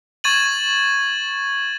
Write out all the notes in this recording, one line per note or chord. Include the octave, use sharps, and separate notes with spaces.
C#6 G#6 A6 D#7 F#7